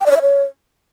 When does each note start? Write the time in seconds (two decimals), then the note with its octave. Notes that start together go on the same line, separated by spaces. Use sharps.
0.01 G5
0.06 D5
0.11 C#5
0.16 E5
0.22 C#5